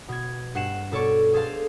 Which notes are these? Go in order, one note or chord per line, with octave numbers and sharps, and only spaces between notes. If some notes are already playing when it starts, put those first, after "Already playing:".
B2 G#6
G2 F#5 C7 E7
B2 A4 C#5 D5 C#6
G#4 A4 C5 F5 A5